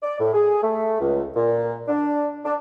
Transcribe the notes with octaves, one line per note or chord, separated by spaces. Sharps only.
D5
A2
G#4
A3
C#2
A#2
D4
D4